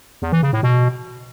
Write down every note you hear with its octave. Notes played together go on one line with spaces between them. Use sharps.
E2
E3
C#3
A2
B2